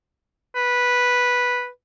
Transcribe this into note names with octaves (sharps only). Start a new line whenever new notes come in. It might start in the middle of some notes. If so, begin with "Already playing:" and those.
B4